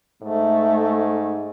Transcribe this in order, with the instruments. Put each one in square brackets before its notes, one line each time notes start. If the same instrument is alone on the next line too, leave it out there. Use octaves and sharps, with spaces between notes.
[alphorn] G#2 [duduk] A3